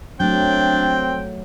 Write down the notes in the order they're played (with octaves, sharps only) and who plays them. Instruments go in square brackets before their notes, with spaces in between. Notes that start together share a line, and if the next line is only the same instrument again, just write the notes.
[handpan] F#3 A3 [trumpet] C4 [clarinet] D4 [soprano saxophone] G5